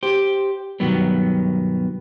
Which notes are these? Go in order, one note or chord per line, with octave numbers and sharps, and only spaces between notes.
G4 C5
G2 B2 D#3 F#3 B3